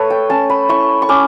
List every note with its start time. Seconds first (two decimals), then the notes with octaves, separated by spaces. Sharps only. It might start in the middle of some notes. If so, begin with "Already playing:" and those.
Already playing: A3 A4 B4 C#5
0.10 G5
0.30 C#4 A5
0.50 B5
0.69 E4 C#6
1.02 C#6
1.09 C#4 D6